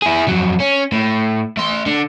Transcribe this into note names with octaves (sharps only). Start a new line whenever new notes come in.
E4 G#4
F2 F#3
C#4
A2
A3 C6
D3